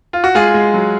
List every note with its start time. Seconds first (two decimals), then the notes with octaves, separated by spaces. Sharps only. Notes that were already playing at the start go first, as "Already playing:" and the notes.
0.13 F4
0.24 F#4
0.35 G#3 F4 G#4
0.54 G#3
0.74 F#3